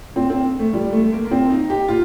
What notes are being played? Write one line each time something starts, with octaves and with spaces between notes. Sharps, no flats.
A#2 C4
C4
A3
A#2 G3
A3
A3
A#3
A#3
A#2 C4
D#4
G4
A#2 F4